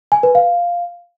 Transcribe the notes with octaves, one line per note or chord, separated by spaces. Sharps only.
G#5
B4
F5